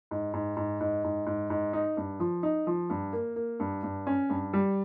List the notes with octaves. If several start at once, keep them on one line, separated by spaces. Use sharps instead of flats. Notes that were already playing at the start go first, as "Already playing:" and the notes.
G#2
G#2
G#2
G#2
G#2
G#2
G#2
D#4
G2
F3
D#4
F3
G2
A#3
A#3
G2
G2
C#4
G2
G3